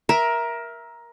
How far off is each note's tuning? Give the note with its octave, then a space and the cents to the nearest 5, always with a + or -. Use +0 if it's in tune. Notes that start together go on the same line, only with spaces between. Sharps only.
A#4 +15 E5 +0